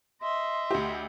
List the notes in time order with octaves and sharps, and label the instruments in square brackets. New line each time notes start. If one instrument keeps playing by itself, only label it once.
[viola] D#5 E5 [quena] C6
[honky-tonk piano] D2 G4